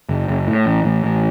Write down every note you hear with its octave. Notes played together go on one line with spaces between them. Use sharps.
F#1
F#1
A2
A1
A1
A1